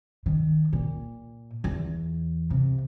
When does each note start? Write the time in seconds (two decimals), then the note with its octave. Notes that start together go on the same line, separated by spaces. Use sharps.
0.26 D#3
0.73 A#2
1.64 E2
2.50 C3